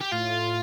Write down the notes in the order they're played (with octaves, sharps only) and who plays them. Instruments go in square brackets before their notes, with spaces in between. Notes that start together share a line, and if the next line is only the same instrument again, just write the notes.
[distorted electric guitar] G4
[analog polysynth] A2 [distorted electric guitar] F4